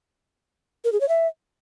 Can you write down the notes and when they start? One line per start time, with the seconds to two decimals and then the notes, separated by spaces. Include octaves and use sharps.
0.85 A#4
0.93 G#4
1.01 C#5
1.09 E5